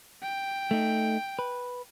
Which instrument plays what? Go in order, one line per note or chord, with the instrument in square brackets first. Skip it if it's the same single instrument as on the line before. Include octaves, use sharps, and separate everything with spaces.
[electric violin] G5
[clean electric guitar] A3 D#4
B4